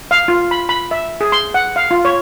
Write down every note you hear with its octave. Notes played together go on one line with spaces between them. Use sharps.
F5
F4
B5
B5
E5
G#4
C6
F#5
F5
F4
C#5